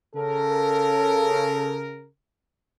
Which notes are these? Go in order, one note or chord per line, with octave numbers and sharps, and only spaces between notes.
C#3 A4 A#4